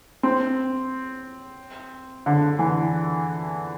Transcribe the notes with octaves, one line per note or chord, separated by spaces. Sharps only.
C4
D3
E3